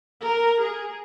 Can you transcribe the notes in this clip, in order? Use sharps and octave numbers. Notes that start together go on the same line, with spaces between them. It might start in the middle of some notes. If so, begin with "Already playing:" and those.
A#4
G#4